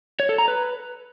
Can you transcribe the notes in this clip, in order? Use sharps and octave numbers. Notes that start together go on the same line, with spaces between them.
C#5
A4
A#5
B4